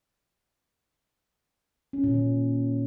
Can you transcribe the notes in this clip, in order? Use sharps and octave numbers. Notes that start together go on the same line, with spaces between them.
C#4
A#2
D#3